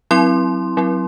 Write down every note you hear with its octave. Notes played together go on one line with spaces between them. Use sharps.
F#3 C4 E4 C6
F#3 C4 E4